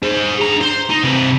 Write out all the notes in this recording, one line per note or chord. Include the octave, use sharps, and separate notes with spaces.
G#4 C5
D3 A#5
C5
D#4
C3 B4